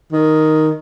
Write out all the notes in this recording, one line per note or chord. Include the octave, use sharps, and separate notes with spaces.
D#3